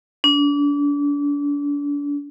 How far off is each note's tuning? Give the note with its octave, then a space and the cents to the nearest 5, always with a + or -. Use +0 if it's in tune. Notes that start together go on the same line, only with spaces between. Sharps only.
D4 -35